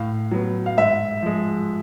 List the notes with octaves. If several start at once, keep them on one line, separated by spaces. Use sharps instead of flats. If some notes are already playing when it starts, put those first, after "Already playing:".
Already playing: A2 F5
F#3 B3
F5
G#2 E5
F3 G#3